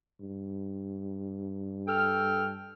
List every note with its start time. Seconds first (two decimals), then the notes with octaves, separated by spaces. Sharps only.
0.20 G2
1.88 A4 G5 F6